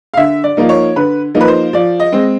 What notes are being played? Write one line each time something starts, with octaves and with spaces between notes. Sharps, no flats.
F5
D3 E5
D5
F3 A#3 D#4
C#5
D3 B4
F3 A#3 D#4
B4
C5
F3 D5
D#5
G#3 C4